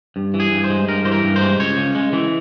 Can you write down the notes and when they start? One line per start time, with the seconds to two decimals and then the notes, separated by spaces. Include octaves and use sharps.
0.16 G2
0.34 E3
0.40 G#4
0.52 G2
0.64 C5
0.70 G#3
0.88 G2 A#4
1.05 E3 C5
1.12 A#4
1.24 G2
1.36 C5
1.41 G#3
1.59 C#2 C#5
1.77 C#3
1.95 G#3
2.13 E3